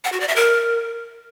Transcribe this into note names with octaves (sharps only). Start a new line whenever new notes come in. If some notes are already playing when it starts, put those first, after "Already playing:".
F#5
F#4
D5
E5
A#4